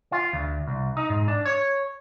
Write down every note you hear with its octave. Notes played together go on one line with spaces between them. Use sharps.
F4
D2
C2
D#4
G#2
D4
C#5